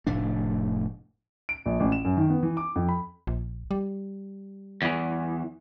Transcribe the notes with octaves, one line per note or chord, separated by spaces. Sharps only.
F1 A2 A3 D4
D7
A#1
A1
E7
F#2
D#3
B3
E3
D6
F2
B5
A#1
G3
E2 E3